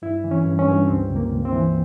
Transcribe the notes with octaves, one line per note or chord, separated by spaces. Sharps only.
G2 E4
E3
C#4
G2
C#4
G2
C#2 C4
C#2
A#3
C#2
C4
E3